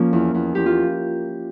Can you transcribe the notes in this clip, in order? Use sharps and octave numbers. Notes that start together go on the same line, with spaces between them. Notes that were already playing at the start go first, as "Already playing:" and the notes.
Already playing: F3 A#3 C#4
E2
E2
E2 G4
F4